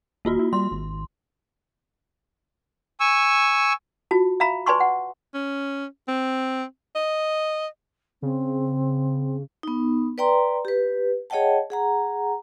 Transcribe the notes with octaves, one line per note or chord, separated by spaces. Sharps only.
D#1 A#3 F4 F#4
E4
G3 C6
G#1
G#5 C#6 E6
F4 F#4 A5
E5 F5 A#5 B5
B4 D5 G#5 A5 C6 C#6
F#5
C#4
C4
D#5
C#3 C4
B3 D#4
B4 D5 G5 A#5 C6
G4 B4
G#4 C#5 D#5 F#5 G5 A5
G#4 F#5 A#5